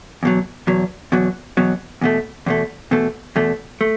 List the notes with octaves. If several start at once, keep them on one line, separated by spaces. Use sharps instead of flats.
E2 B2 F#3
E2 B2 F#3
E2 B2 F#3
E2 B2 F#3
E2 B2 A3
E2 B2 A3
E2 B2 A3
E2 B2 A3
A3